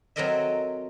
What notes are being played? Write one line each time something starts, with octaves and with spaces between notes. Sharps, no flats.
F#3 C4 A4 A#4 D#5 E5